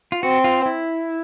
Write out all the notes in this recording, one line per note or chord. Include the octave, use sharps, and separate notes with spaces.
F4
C4 F#4
F4
E4